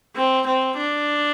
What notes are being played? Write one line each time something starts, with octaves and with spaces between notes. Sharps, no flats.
C4
C4
D4